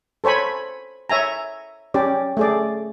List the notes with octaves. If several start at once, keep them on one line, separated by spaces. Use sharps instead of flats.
A4 C5 C#5 G#5 B5
C#5 E5 G#5 A#5
C#4 G4 D5
A3 G#4 D5